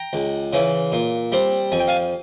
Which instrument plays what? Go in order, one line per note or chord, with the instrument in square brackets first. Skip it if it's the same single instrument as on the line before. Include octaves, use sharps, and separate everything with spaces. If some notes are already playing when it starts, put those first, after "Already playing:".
Already playing: [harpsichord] G5 A#5
C#2
C#3 E3
A#2
G3 C4
F2 G#5
G5
F5 G#5